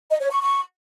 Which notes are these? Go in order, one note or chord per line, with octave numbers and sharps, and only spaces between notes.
D#5
C#5
C#6
C#6